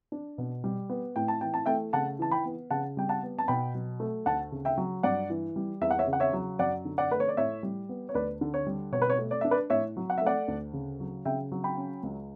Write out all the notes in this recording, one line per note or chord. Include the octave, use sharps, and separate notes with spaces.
D4
B2
G3
B3
A2 G5
A5
E3 G5
A5
A3 E5 G5
C#3 F#5 A5
E3 A5
G5 B5
B3
C#3 F#5 A5
G3 G5
F#5 A5
B3
A5
B2 G5 B5
F#3
A3
D2 F#5 A5
C#3
E5 G5
F#3
G2 D5 F#5
E3
G3
E2 E5
F#5
C#5 E5
C#3
F#5
C#5 E5
F#3
F#2 D5 F#5
D3
D5 F#5
A3 B4
C#5
D5
A2 C#5 E5
G3
B3
C#5
D2 B4 D5
D3
C#5
G3
B2 C#5
B4
C#5
A3
D5
D4 E5
B4 D5
A2 C#5 E5
F#3
F#5
E5
A3 D5 F#5
D2
C#3
F#3
C#3 E5 G5
F#3
G5 B5
C#4
C#2